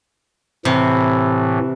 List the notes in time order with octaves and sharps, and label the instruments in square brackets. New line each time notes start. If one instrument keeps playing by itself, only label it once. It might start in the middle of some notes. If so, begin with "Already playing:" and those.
[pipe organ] A2 E3 [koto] C3